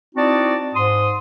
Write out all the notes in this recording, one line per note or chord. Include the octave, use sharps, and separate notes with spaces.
C4 D#4 E4 F#4 D5 A5
G#2 C6 D#6